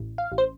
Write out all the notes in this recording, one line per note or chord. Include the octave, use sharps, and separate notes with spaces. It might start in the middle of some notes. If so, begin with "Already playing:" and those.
Already playing: A1
F5
A1
C5